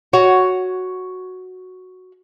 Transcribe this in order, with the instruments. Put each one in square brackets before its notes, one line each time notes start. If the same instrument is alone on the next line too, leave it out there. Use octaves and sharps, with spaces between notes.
[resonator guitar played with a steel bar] F#4 C#5